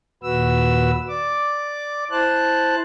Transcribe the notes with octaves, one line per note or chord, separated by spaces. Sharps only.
D#2 A#2 F#4 B4 E6
D5 D6
E4 C5 A5 F#6